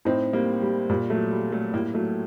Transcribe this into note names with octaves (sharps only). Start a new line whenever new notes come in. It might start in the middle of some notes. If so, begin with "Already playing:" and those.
A2 C4 D#4
G3 A#3
G3
A#2 G3
F#3 A3
G3
F#3 A3
A2 G3 A#3
F#3 A3